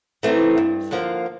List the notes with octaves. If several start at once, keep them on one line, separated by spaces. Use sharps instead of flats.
E3 A3 C4 D#4
G2
D3 F3 A#3